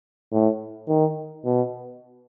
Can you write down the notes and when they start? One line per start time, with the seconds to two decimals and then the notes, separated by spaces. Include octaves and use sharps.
0.32 A2
0.88 D#3
1.45 B2